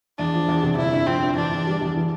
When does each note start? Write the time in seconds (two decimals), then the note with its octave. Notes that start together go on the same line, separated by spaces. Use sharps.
0.18 E2 D4
0.34 F3
0.48 E2
0.63 C3
0.77 G1 E4
0.93 G2
1.07 F3 C4
1.23 G2
1.36 E3 D4
1.52 E2
1.67 G3
1.81 E2
1.96 E3